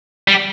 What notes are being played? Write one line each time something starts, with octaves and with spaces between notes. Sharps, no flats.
G3